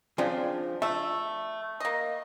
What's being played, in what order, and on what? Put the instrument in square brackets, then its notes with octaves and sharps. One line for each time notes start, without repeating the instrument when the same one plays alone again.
[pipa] C#3 [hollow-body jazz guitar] F3 C4 D4
[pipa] A3 [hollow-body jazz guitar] E5
[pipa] A#3 D#5